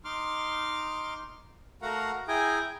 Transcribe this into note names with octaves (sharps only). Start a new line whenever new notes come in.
D#4 C6 D6 F6
A3 F#4 A#4 F5 F#5 A#5
E4 G#4 G5 G#5 A#5